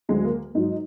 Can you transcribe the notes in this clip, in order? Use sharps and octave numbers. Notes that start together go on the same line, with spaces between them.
D2 D3 F#3 G#3
A#3
G#2 F#3 D#4